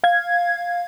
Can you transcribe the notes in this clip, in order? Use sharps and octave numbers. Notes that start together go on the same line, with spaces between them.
F5 G#6